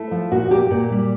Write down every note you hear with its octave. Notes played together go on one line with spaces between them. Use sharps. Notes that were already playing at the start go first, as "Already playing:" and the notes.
Already playing: A3 E4
F3
A#2 F#4
A#2 G4
A#2
G3